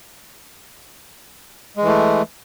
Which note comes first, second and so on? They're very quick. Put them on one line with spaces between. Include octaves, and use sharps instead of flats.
G#3 E3 A3